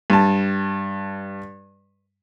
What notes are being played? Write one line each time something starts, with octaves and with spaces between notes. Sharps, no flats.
G2 A5